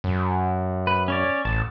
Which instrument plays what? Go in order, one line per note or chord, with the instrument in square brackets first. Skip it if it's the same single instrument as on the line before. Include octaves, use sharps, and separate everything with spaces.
[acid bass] F#2
[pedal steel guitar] B4
C#4 C#5 D5
[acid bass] A1 [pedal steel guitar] A5